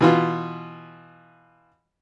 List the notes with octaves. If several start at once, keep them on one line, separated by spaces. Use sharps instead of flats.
B2 E3 F4